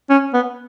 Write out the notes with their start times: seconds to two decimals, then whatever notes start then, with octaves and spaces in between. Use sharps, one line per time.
0.10 C#4
0.33 B3